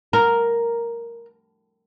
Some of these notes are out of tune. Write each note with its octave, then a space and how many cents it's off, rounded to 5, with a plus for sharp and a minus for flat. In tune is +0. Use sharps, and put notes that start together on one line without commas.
A#4 +0